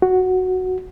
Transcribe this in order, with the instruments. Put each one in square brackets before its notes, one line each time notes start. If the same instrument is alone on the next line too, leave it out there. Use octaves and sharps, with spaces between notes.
[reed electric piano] F#4